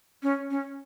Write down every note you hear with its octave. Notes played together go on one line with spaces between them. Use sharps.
C#4
C#4